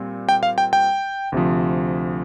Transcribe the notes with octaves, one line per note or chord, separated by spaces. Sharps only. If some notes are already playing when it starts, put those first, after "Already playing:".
Already playing: A#2 G3 C4
G5
F5
G5
G5
D2 C3 F3